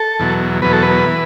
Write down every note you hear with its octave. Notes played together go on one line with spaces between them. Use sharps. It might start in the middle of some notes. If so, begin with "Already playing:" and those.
Already playing: A4
E2 B2 F#3
E2 B2 F#3 B4
A4
B4
E3